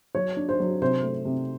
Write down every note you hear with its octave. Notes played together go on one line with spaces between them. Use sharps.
F#3 C#5
D4
C5
F#3
C3 C5
A3
C3